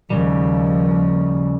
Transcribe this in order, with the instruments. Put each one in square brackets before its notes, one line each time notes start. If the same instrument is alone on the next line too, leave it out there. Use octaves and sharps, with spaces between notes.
[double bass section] D#2 F3 [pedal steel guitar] C#3 G3